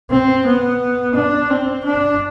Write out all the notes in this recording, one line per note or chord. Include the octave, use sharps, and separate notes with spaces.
C4
B3
D4
C4
D4